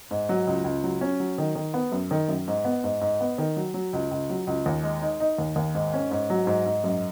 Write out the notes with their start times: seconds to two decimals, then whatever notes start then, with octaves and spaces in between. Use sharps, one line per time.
0.11 G#2
0.29 F#3
0.47 C#2
0.64 C#2
0.84 F#3
1.01 C#4
1.20 F#3
1.38 D#3
1.55 D#3
1.74 B3
1.92 F#2
2.11 D#3
2.28 F#2
2.48 G#2
2.65 B3
2.84 G#2
3.01 G#2
3.20 B3
3.38 D#3
3.56 F#3
3.74 F#3
3.93 C#2
4.11 C#2
4.30 F#3
4.47 C#2
4.66 D#2
4.83 G#3
5.02 D#4
5.20 D#4
5.38 D#2
5.56 D#2
5.75 G#2
5.93 C#4
6.11 G#2
6.30 F#3
6.47 G#2
6.66 G#2
6.84 F#2